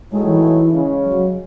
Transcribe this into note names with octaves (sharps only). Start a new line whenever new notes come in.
A2 F#3 G#3 A3 D#4 G#4
E3
C#3 G#3 C#4
F#3